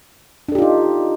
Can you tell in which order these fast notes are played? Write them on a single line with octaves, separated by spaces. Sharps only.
D4 A4 G4 F4 D#4